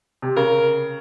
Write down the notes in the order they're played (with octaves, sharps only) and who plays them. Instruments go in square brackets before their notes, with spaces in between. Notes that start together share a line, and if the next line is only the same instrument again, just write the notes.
[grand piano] C3
[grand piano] C#3 [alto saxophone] A#4